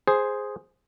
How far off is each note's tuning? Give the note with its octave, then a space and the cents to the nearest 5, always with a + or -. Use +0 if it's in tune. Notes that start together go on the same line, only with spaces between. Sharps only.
G#4 +0 C5 +0